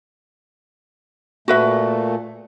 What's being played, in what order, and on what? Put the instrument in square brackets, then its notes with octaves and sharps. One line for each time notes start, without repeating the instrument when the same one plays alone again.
[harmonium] A#2 A3 [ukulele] F#4 B4 E5